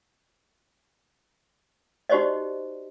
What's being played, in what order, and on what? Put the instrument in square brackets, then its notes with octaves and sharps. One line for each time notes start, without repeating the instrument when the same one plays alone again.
[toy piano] D#4 F#4 G4 C5 D5 D#5